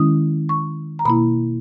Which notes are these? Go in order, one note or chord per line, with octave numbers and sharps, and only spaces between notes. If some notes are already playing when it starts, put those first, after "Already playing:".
Already playing: D#3 G#3 C#4 E4 D#6
C#6
A#5
B2 A#3 E4 B5